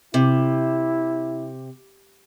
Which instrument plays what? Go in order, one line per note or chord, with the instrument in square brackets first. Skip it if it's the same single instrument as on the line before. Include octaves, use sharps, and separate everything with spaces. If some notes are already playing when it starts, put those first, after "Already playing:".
[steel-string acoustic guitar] C3 [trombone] E4